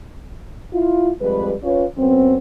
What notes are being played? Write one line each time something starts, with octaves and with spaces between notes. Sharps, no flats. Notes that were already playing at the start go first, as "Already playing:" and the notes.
E4 F4
F2 G3 G#3 B4
C#4 F4 B4 C#5
F#2 B3 C4